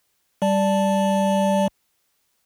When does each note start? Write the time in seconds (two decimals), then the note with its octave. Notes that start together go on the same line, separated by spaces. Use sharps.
0.42 G3 D5 A5